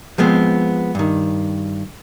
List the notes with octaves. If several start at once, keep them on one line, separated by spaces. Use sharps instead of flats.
F3 G#3 B3 C4
G2 D#3